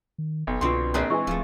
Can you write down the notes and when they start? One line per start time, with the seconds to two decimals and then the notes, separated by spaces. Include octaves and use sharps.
0.18 D#3
0.47 F#1 B1
0.61 C2 B2 D3 C4 F4 C6
0.94 A#1 C4 G#4 B4 D5
1.10 E3 G#3 G#5 C#6
1.27 D1 F3 A3